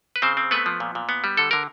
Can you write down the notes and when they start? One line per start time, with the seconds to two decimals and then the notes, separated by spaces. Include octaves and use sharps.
0.16 B4
0.22 C#3 C4 C5
0.37 C4
0.51 A3 B3 B4
0.66 F3
0.80 A#2
0.95 A#2
1.09 B3
1.24 G3
1.37 D3 A4
1.51 D3 A#4